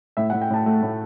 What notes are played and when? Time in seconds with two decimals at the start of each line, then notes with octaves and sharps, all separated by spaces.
0.17 A2 E5
0.30 A2 F#5
0.42 G5
0.50 A2 A5
0.66 A3
0.82 A2